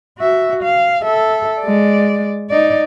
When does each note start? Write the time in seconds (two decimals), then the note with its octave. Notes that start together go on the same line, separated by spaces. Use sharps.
0.18 F#4 E5
0.63 F5
1.04 A4 E5
1.60 G#3 D5
2.50 D#4 D5